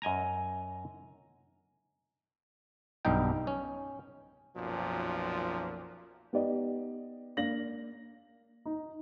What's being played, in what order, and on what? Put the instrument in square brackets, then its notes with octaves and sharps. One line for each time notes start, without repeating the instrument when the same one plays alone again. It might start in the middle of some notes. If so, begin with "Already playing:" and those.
[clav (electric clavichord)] F#2 D#5 G#5 A#5
B1 G2 G3 D#4 G5
C#4
[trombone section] B1 F#2 A#2 F3
[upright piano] B3 D#4 G4 D5 D#5
A#3 D4 F5 A#6 F#7
[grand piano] D#4